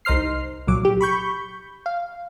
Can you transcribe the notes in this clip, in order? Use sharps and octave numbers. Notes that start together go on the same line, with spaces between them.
C2 D#4 C5 F6 C7
C2 A#2 F#3 D6
G4
B5 C#6 G6
F5